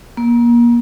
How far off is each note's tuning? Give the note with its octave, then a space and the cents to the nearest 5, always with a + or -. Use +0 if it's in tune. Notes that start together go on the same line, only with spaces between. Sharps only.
A#3 +30